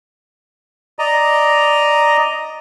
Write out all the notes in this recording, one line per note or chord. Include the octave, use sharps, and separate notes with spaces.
D5 D#5 A#5